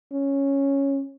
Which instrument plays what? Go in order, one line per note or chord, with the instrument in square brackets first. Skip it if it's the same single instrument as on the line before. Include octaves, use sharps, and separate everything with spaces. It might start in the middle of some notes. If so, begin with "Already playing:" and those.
[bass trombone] C#4